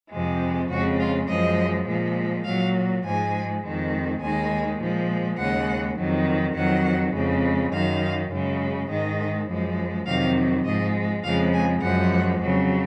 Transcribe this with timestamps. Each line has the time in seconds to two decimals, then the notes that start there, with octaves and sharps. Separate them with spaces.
0.11 F2 C3 F3 G#3
0.70 F2 C#3 G#3 F#4
0.99 F4
1.28 F#2 F3 G#3 D#5
1.87 A#2 F3 G#3
2.45 A#2 F#3 F5
3.04 G#2 F3 G#3 G#5
3.62 F2 D#3 G#3
4.21 D#2 D#3 G#3 G#5
4.80 A#2 F3 G#3
5.37 D#2 C#3 G#3 F#5
5.97 F2 D#3 F#3
6.55 F2 D#3 F#3 F#5
7.14 F2 C#3 G#3
7.72 F#2 D#3 F#3 F5
8.30 F#2 C#3 G#3
8.89 G#2 D#3 G#3 D#5
9.48 F#2 F3 G#3
10.06 F2 C3 D#3 F#3 F5
10.64 G#2 F3 G#3 D#5
11.23 F2 C#3 F3 G#3 F5
11.52 G#5
11.81 F#2 F3 G#3 F#5
12.41 F2 C#3 F#3